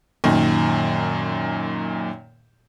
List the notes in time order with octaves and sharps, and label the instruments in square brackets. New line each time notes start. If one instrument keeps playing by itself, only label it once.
[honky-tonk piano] F#2 A#2 D#3